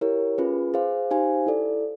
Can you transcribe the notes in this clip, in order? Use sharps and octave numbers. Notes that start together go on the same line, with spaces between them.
E4 G4 A#4 C#5
C#4 F4 G#4 B4
G#4 C5 F5
D#4 G4 C5 F5 G#5
E4 A4 D5